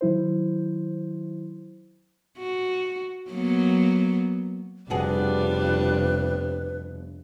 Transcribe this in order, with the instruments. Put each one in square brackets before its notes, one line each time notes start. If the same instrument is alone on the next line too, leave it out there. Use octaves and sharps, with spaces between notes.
[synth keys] D#3 F#3 E4 C5
[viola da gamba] F#4
F#3 A#3 B3
[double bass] F1 [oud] G2 B2 G#4 [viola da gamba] G3 D4 F4 [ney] B4